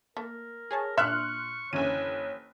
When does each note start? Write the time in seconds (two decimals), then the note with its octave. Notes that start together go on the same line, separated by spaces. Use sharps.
0.17 A3 A#3 A#4
0.71 G#4 C#5 A5
0.98 A#2 D4 E5 C6 C#6 F6 F#6
1.73 F#1 D3 E3 C#4 C#5 D#7